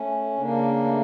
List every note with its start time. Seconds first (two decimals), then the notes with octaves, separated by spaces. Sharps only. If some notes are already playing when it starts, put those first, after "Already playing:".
Already playing: A3 C#4
0.37 C#3 A#3 D4
0.84 A3